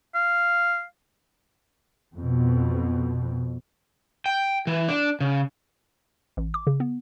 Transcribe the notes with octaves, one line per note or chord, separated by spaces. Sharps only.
F5
F2 B2
G5
E3
D4
C#3
A1
D6
C#3
B3